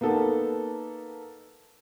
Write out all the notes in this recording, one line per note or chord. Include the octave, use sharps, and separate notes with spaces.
A#3 B3 D#4 A4